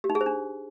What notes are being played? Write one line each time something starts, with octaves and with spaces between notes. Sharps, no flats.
G4
D#4
G#4
C5
D4